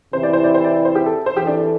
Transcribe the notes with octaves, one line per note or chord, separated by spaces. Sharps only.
C3 E3 C4 E4 C5
D5
C5
D5
C5
D5
D5
C5
G4
A4
C5
E3 C4 G4 A4
D4